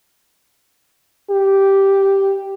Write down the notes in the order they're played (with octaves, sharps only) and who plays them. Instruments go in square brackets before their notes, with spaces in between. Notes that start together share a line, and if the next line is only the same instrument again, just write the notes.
[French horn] G4